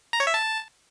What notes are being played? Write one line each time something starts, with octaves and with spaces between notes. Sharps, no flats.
A#5
C#5
E5
A5